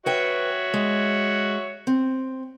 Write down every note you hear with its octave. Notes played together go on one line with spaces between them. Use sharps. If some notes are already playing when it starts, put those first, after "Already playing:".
F#4 B4 C#5 E5 G5
G#3
C4